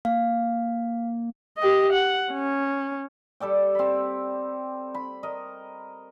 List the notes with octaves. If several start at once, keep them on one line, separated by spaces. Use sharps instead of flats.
A#3 F5
G4 D#5
F#5
C#4
G3 A4 D5 G5
C4 B5
B5
A#4 D#5